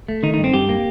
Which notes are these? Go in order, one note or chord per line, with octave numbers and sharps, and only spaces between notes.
A3
D#3 D#4
G2 D#4
C4
G2 G4
A#3